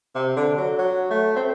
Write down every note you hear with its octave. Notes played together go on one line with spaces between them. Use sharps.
C3
D3
F#3
F#3
A3
C4